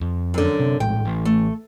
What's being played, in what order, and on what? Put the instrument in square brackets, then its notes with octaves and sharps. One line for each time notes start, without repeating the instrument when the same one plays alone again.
[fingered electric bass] F2
[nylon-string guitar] F#2 D3
[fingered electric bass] C3
[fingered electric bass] A#1 A2 G#3 [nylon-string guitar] G5
[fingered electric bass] A1
[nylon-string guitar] A3